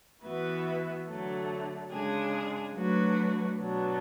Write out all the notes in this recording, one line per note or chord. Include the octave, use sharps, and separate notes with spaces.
E3 B3 F#4 B4 E5
D3 F#3 A3
C#3 G#3 D4 G#4
F#3 A3 D4 F#4 B4
B2 F#3 B3 D4